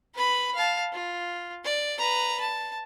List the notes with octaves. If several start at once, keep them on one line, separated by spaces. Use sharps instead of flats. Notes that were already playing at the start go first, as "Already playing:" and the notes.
B4 B5
F5 A5
F4
D5
B4 A#5
A5